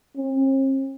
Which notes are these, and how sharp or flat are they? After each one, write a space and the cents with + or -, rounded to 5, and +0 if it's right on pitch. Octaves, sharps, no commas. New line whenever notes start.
C4 +45